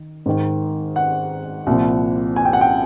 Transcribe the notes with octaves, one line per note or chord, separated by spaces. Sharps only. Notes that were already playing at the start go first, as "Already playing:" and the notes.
Already playing: D#3
G#2 D#3
F#5
C2 A#2 F3
G#5
G5
F#5
G5